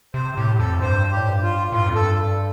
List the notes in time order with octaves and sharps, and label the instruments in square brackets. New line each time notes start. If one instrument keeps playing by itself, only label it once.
[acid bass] C3 [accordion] C5
[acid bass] A2 [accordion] G4
[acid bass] F2 [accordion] A4
[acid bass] G2 [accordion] C5
[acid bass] A2 [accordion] G4
[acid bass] G2
[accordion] F4
[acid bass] A2 [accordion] F4
[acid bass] G2
F2
[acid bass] G2 [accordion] A4